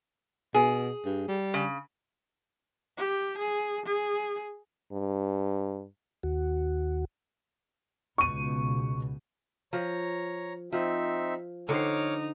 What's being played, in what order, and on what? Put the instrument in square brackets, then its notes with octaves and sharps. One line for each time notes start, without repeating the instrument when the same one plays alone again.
[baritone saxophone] B2 [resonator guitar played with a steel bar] G#4
[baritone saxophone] G2
G3
[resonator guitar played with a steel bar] C#3
[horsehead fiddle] G4
G#4
G#4
[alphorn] G2
[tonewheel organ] D#2 F#4
[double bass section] C#2 B2 [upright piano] C#6 D#7
[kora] F3 [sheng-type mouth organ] C#5 A#5
[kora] F3 [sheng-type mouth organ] C4 D#4 E5
[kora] D3 C5 [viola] D#4 [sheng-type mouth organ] C#5 D6 F6